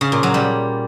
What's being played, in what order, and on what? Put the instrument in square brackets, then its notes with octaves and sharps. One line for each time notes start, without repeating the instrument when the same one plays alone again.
[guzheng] C#3
A#2
F#3
G3